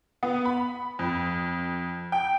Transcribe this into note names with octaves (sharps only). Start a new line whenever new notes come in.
B3
B5
F2
G5